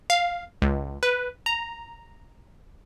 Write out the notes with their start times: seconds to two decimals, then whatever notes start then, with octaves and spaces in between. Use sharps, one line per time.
0.10 F5
0.62 C#2
1.03 B4
1.46 A#5